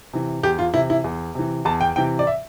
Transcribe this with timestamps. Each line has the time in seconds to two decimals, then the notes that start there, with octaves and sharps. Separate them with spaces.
0.13 C3 E3
0.43 E2 G4
0.59 F4
0.74 C3 E3 E4
0.90 E4
1.04 E2
1.35 C3 E3
1.65 E2 A5
1.81 G5
1.96 C3 E3 G5
2.19 D5
2.27 E5